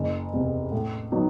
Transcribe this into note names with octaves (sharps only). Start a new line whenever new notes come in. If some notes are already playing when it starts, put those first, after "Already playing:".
Already playing: F#1
E2 C3
A2
F#3 B3 D#4